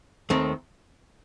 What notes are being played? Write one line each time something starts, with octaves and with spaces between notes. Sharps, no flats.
D#2 D#3 A3 C4